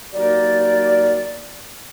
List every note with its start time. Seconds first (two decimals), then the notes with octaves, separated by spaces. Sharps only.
0.12 F#3 G3 A#3 D#4 A#4 D5